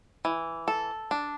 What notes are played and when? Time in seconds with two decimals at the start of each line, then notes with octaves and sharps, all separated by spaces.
0.25 E3
0.68 A4
1.11 D4